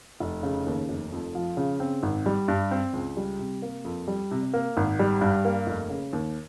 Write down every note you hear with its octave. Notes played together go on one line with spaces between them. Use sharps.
F1
C#3
D#2
F1
F2
F3
C#3
C4
G#1
G3
G2
C4
C#2
G3
C3
A#3
F2
G3
C3
A#3
G#1
G3
G2
A#3
F1
C#3
D#2